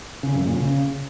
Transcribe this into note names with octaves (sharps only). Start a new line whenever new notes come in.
C#3
F#2
A#2
C#3